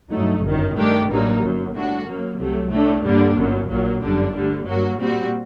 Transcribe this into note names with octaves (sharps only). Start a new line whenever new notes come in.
G2 F#3 A3 D#4
G1 F#2 D#3
G2 D#3 A3 D4 G4
A1 G2 F#3 A#3 D#4
G1 F#2 F#3
A2 G3 D4 F#4
F#2 F#3 A#3
C2 C3 F#3 A3
A2 A3 D4
G2 D3 G3 A#3 D4
G1 F#2 F#3
A#1 A#2 F#3
G1 F#2 D3 G3 D4
D2 D3 G3
G2 F#3 A#3 F#4
A#2 G3 C4 F#4